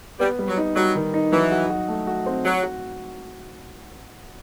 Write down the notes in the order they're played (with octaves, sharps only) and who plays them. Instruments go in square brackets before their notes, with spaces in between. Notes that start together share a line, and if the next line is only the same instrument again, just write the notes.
[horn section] G3 [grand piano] B3
[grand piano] G3
[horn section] F#3
[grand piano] D#4
[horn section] F#3 [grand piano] G3
[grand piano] D#3
D#4
[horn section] E3 [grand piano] F#3
[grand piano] F#4
F#4
A3
F#4
C4
[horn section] F#3 [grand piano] F#4
[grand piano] F#4